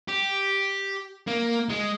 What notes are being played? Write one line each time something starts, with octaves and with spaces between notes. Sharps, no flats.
G4
A#3
G#3